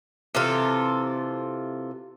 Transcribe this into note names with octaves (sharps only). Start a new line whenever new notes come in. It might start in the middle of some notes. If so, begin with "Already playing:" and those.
C3 E3 F4 A4